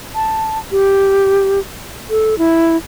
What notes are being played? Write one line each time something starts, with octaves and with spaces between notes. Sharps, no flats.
A5
G4
A4
E4